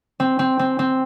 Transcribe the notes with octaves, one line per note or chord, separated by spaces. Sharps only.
C4
C4
C4
C4